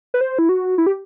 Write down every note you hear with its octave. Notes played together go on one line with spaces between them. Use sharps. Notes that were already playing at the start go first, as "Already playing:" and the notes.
B4
C5
E4
F#4
E4
G4